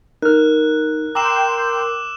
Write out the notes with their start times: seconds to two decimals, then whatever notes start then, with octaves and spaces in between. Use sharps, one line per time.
0.22 D#4 A#4 F6 F#6
1.15 G5 A#5 C6 D6 E6 E7